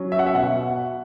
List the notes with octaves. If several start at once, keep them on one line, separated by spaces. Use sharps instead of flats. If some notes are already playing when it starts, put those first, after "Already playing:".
Already playing: F#3 C#4
E5
F#5
E5
B2 F#5